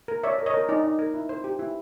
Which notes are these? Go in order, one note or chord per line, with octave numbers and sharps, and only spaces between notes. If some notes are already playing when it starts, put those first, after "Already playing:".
A#4
C#5 D5 E5
A#4
C#5 D#5
A#4
D#4 D5
D#4
A#4
E4
C5
G4
E4